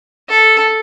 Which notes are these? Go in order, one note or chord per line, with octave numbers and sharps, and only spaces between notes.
A4